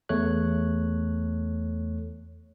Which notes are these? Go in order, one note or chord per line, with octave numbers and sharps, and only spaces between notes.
E2 A3 A4 C#5 F#6